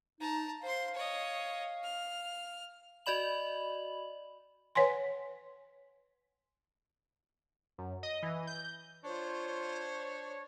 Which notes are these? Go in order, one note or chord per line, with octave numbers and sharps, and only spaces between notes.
D#4 A5 A#5
C5 F5 C6
C#5 D#5
F6
F#4 D5 D#5 B5 F#7
B4 C#5 F#5 G#5 C6
F#2
D#5
E3
G6
D4 F4 C5 C#5